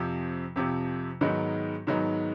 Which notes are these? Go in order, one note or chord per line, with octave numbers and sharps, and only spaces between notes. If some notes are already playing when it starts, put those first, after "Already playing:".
Already playing: F2 C3 F3
F2 C3 F3
G#2 D#3 F#3 B3 D#4
G#2 D#3 F#3 B3 D#4